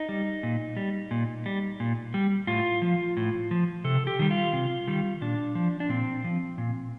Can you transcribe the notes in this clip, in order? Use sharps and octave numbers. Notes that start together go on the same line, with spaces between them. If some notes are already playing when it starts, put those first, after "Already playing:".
Already playing: D#4
G3
A#2
G3
A#2
G3
A#2
G3
A2 F4
F3
A2
F3
C3 A4
G4
D#3 G3
F4
C3
D#3 G3
A#2 D4
F3
D4
A#2 C4
F3
A#2